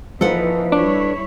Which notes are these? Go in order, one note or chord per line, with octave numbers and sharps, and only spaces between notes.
E3 F3 A#3 D#4 A4 B4 F#5
G3 D4 E4 C#5